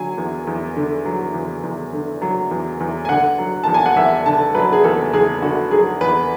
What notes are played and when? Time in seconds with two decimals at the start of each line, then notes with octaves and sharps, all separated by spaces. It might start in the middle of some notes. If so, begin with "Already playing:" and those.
Already playing: D3 F#3 G#5
0.18 E2
0.47 E2
0.76 D3
1.05 F#3
1.34 E2
1.63 E2
1.93 D3
2.22 F#3
2.51 E2
2.80 E2
3.05 G#5
3.09 D3 F#5
3.38 F#3
3.64 E2 A5
3.74 G#5
3.86 F#5
3.97 E2 E5
4.26 D3 A5
4.54 F#3 B4
4.73 G#4
4.84 E2 A4
5.13 E2 G#4
5.42 D3 F#4
5.71 F#3 G#4
6.01 E2 B4